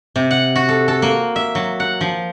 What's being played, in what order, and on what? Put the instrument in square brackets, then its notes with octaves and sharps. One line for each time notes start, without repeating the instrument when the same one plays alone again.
[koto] C3
F#5
F#4
A4
A4
A#3
E5
F#3
F#5
F3